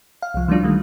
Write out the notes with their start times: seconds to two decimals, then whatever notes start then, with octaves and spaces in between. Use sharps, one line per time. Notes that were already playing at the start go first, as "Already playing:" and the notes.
0.22 F5
0.34 C2 F3
0.48 E3 F#3 G#3 D4 F4
0.63 D#3 G3 A3